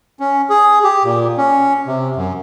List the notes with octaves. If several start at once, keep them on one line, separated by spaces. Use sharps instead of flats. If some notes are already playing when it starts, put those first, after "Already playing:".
C#4
G#4
G4
A#2
C#4
C3
F#2